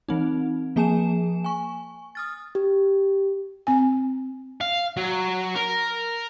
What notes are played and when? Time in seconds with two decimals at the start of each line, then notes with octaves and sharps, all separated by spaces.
0.09 E3 C4 D#4
0.76 F3 A#3 G#4 G#5 A5 E7
1.44 G#5 C#6
2.15 D#6 F6 A6
2.55 G4
3.67 C4 G#5
4.61 F5
4.97 F#3
5.55 A#4